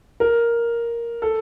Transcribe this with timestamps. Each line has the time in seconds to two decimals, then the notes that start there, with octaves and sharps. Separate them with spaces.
0.20 A#4
1.22 A4